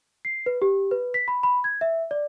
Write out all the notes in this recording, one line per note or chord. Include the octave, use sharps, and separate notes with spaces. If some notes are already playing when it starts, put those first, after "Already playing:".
C7
B4
G4
B4
B6
B5
B5
G#6
E5
D5